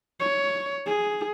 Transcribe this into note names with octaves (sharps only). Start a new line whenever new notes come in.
C#5
G#4